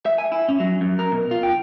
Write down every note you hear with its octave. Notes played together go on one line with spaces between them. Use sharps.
E5
G#5
E4
C#4
F#3
F#2
A#4
B2
F4
G5